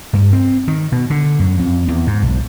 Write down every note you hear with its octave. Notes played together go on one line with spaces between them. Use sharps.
G2
C4
D#3
B2
D3
F#2
F2
E2
G#2
B1